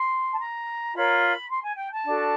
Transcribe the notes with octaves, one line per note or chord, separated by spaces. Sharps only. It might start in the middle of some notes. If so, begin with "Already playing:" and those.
Already playing: C6
A5
A#5
F4 A#4 C#5 B5
C6
G#5
G5
A5
D4 F#4 A4